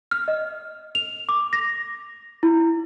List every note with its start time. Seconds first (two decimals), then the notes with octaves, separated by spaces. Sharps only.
0.11 F6
0.28 D#5
0.95 F7
1.29 D6
1.53 A#6
2.43 E4